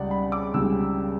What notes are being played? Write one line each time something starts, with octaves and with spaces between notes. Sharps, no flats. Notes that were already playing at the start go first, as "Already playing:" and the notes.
Already playing: C#2 C#3 G3 D5 F#5
B5
D6
C#2 C#3 G3 E6